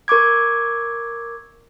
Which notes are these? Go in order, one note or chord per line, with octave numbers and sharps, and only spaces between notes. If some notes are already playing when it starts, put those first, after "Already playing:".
A#4 C#6 D6 G#6